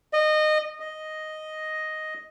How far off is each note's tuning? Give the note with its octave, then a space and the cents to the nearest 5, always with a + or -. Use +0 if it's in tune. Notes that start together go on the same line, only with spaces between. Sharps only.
D#5 -20
D#5 +0